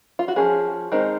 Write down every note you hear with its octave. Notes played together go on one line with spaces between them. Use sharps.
F4
F#4
F3 G#3 C#4 G#4
D#3 G#3 C4 D#4